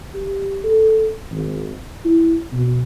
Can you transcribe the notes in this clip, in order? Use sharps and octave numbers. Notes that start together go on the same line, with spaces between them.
G4
A4
G#1
E4
B2